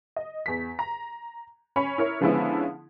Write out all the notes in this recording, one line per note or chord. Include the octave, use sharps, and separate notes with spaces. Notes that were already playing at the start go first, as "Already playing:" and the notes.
D#5
E2 B6
A#5
C#4 C#5 B5
E4 A#4 C#5
D3 F3 G#3 B3 C#4 E4